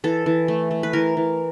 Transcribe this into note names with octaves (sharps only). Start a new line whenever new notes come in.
E3 A4
E3
A3
A3
B4
E3 A#4
E3